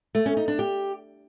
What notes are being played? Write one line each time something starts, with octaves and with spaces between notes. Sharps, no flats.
A3
C#4
D#4
D4
G4